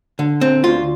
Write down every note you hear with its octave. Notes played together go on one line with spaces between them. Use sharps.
D3
C4
D2 F4